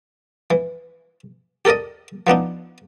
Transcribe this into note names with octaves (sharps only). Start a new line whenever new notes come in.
E3
G4 A4 A#4 D5 D#5
F3 B3 D4 D#4